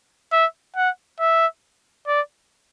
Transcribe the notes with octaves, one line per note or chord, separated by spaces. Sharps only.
E5
F#5
E5
D5